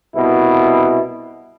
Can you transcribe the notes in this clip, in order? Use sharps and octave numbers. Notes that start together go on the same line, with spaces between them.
C2 B2 E4